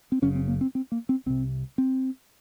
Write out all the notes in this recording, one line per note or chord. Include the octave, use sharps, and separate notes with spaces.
C4
F#1 F#2 C#3 C#4
C4
A#3
C4
C4
A#3
C4
C2 C3 C4
C4